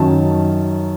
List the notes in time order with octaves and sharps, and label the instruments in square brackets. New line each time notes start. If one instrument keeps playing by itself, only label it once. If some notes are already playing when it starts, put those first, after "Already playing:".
Already playing: [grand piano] F#2 D#3 F#3 C#4 A5